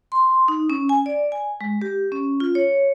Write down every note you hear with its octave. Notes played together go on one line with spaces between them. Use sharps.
C6
D#4
C#4
G#5
D5
G#5
G#3
G4
C#4
F4
C#5